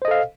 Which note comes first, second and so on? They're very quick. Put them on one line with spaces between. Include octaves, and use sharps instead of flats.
C5 D#5 A4 F5